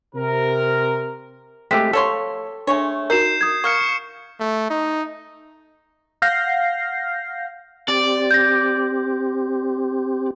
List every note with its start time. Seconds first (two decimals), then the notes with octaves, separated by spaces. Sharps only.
0.15 C3 A#4
1.71 G#3 A3 C4 G4 B6
1.93 F3 A4 C#5 C6
2.67 G#3 A3 D4 C#5
3.10 D#4 F#4 A#4 G6 C7 E7
3.41 D#6 G#6
3.64 A#3 C#6 F6 C#7
4.40 A3
4.70 D#4
6.22 F5 F#5 F6 G6 A#6 C7
7.88 C4 G4 D5
8.31 G6 A#6